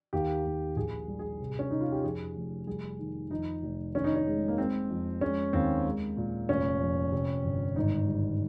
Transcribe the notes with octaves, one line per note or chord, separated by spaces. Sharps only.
D#2 G4
D#2
A#1 G#4
G3
G#4
C3
C#4
C3 D#4
F4
G4
F2 G#4
F1
G3 G#4
D#3
F2 D#4
F1
D#3 C#4
D#4
C#4
G#3
A#3
G#3 C4
F2
G#3 C#4
D#2 C4
G#3
A#2
F1 C#4
F2
C3
G1
G#1 D#4
G3